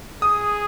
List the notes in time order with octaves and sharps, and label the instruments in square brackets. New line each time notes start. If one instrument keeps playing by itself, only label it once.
[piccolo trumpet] G#4 [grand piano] D#6